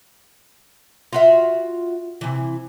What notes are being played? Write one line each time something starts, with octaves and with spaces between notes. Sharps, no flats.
F4 F#4 E5
C3 E3